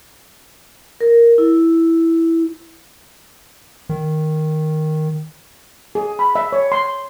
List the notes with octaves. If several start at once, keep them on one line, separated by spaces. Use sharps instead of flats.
A#4
E4
D#3
G#4
B5
E5
C#5
C6